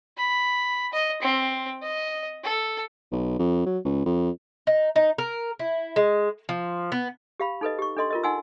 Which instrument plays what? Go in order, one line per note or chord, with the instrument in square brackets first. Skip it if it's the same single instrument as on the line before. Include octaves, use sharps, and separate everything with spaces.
[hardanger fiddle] B5
D#5
C4
D#5
A4
[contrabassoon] B1
F2
F#3
C#2
F2
[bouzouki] D#4
D#4
A#4
E4
G#3
F3
B3
[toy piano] G4 F5 B5
D#4 A4 B4 D#5
G4 C#6
D4 A4 D#5 C6
F4 A#4 D#5
D#4 F#5 G#5 C6 E6